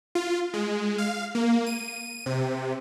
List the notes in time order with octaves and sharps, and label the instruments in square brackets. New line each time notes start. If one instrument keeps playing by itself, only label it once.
[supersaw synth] F4
G#3
F5
A#3
D#7
C3